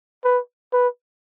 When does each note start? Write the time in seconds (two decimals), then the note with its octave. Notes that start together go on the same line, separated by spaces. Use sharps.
0.24 B4
0.73 B4